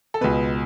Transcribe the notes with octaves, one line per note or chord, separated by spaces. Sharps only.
A4
C#2 B2 B4